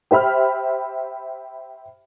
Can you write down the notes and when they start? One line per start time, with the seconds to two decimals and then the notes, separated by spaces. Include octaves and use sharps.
0.11 G4 C5 E5 B5 F6